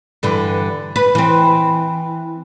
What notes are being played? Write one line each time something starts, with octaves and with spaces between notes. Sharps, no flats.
G2 D3 E3
B4
E3 C4